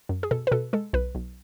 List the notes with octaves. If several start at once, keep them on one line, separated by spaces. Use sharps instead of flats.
F#2
G#4
B2 A4
B4
B2 A4
G#3 A4
B1 B4
B1